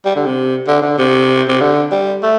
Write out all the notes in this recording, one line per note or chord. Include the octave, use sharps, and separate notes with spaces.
G3
D3
C3
D3
D3
C3
C3
D3
G3
A3